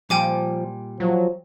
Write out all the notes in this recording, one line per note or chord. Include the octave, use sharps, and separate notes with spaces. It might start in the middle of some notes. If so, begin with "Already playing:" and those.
A#2 F3 G3 G5 G#5 D6
F3 F#3